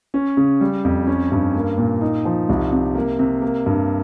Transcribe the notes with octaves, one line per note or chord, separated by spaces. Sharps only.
C#4
C#3
G3
F2
C#4
G2
A#3
A#2
D#4
F3
C2
C3
A#3
C3
A#3
G2